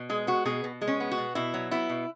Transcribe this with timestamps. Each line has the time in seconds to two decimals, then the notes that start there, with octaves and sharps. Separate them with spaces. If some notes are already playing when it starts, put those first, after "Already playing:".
Already playing: B2
0.10 G#3 G#4
0.27 B3 F#4
0.45 B2 G#4
0.64 B2
0.82 G#3
0.88 C#4
1.00 B3
1.11 F#4
1.18 B2
1.35 B2 E4
1.54 F#3
1.71 B3 E4
1.90 B2